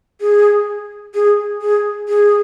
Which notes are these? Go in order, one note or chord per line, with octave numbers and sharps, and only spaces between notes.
G#4
G#4
G#4
G#4